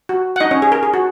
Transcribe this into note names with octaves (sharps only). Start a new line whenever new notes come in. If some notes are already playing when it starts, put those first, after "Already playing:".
F#4
F#5
D#4 D#5
C#4 C#5
G#4
A#4
G#4
F#4